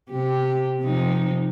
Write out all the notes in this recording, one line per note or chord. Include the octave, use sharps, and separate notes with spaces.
C3 G4
C3 F3 D#4